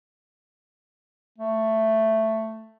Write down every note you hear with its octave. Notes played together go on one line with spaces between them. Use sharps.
A3